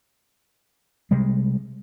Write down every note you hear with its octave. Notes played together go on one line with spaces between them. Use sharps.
C3 G3 G#3